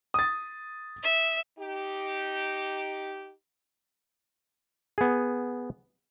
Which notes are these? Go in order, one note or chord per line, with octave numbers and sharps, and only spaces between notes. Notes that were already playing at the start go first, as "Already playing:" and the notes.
D#6 A6
E5
D#4 G4
B3 G#4